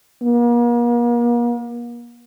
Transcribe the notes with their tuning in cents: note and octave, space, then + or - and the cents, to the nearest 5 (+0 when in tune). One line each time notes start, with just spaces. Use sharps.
A#3 +40